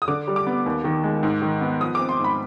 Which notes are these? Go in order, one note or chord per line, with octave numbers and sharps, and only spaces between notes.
D#6
D3 D6
G3
D6
B3
D#2
D#3
G#3
G#2
D#3
B3
F3 D#6
C4 D6
C6
G#2
B5